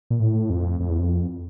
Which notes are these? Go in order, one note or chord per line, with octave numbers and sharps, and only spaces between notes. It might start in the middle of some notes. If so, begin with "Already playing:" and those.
A#2
A2
F2
F2
E2
F2